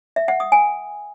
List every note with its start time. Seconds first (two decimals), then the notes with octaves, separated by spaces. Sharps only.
0.16 E5
0.28 F#5
0.40 D#6
0.52 G#5